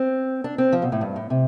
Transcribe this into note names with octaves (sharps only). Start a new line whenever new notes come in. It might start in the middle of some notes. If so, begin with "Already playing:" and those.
Already playing: C4
D4
C4
F3
B2
A2
G2
A2
C3